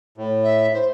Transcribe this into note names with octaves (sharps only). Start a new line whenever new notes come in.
A2
E5
C5